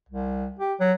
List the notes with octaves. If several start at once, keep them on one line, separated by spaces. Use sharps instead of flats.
C2
G4
F#3